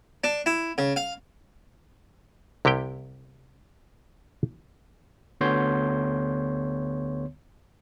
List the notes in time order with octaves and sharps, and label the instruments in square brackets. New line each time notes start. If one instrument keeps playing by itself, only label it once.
[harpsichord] D4
E4
C#3
F5
[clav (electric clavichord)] C2 C3 E4 G4 G5
[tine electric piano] D2 D3 B3 C#5 C6 G6